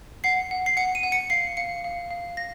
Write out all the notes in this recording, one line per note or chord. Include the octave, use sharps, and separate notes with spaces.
F#5 C7
F#5
C7
F#5 C#7
D#7
F#5
C#7
F5 C7
F5 C#7
F5
F5
F5 A#6